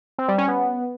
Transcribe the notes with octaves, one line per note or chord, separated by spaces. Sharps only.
C4
G3
C#4
B3